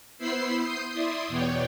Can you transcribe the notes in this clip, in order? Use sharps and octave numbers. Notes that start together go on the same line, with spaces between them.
B3 E4 C5 B5 E6 C7
C6 D#6 G6
E4 D5 E5 C6 D#6
E2 B2 B3 C#5 D5 G5